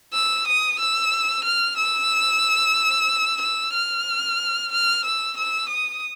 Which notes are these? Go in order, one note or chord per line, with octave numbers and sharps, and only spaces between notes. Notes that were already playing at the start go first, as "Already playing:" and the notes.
E6
D#6
E6
F6
E6
E6
F6
F6
E6
E6
D#6